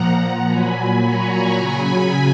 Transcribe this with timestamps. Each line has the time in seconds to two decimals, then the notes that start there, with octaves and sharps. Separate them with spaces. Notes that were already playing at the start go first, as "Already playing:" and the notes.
Already playing: A#2 F3 F#5 A#5
0.47 A#2 F#3 G#5 B5
1.02 A#5 C#6
1.57 C#3 F#3 G#5 B5